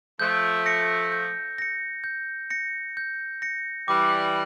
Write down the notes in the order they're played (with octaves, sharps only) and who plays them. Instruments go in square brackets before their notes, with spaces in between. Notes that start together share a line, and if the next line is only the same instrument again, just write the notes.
[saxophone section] F3 A3 [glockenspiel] G6
[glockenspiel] A#6 C#7
G6
A#6 C#7
G6
A#6 C#7
G6
A#6 C#7
[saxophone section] E3 G3 [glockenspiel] D6